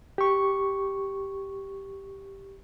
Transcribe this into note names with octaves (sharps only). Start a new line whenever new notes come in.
G4 C#6